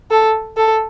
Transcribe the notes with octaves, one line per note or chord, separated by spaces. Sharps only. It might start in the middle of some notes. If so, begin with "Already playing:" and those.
A4
A4